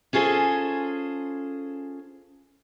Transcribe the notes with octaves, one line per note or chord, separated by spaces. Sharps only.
C#4 F4 G#4 A4 C5